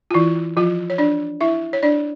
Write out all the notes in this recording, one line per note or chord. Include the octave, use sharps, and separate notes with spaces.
F4
E3 E4
F3 F4
C#5
D4 D5
E4 E5
C#5
D4 D5